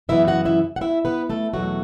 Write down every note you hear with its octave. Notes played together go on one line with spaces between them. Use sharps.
F#2 C#3 E3 B3 E4 E5
F#4 F#5
E4 E5
F#5
E4 E5
B3 B4
A3 A4
E2 B2 F#3 A3 F#4